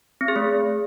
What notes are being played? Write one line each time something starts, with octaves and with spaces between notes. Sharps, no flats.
C4
G#4
A3